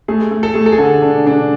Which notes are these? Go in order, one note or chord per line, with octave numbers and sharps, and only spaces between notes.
A3 G#4
A3
A4
A3 G#4
A4
G#4
D3 A4
D4
D4